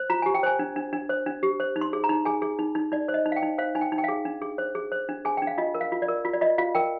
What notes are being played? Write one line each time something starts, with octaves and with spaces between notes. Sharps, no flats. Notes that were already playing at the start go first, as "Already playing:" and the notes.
Already playing: C5
F4 A#5
G4 G#5
G5
C5 G#5
D4
D4
D4
C5
D4
G4
C5
D#4
C6
G#4
A#5
D#4
G#4 G#5
G#4
D#4
D#4
D#4 D5
C5
D#5
D#4
F5
G5
D#4
C5 F5
D#4 G#5
G5
D#4
G5
G#4 F5
D4
G#4
C5
G#4
C5
D4
G#4 G#5
D4 G5
F5
F4 D#5
A#4
F5
F4
D5
A#4
F4
D5
F4 D#5
F4 F5
A#4 G5